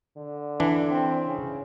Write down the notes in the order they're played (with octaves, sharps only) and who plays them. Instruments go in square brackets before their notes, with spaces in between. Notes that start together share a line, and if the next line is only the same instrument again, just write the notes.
[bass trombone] D3
[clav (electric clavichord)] E3 D4
[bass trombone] C4
C#3